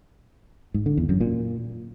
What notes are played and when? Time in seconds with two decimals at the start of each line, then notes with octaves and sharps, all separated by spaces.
0.74 G#2
0.86 D3
0.97 E2
1.09 F#2
1.20 A#2